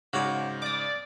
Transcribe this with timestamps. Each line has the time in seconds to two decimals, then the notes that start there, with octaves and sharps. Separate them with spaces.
0.13 G#2 C#3 F#4 C#5 D5
0.62 D5 D6 D#6